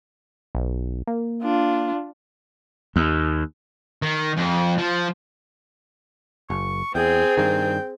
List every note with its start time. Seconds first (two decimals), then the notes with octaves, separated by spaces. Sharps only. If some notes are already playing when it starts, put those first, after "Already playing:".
0.55 B1
1.07 A#3
1.43 D4 F4
2.96 D#2
4.02 D#3
4.37 F2
4.78 F3
6.50 F#1 C#6
6.95 E2 C4 G#4 G5
7.37 G2 D#3 G5